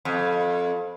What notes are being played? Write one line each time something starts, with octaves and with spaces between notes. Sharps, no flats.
F2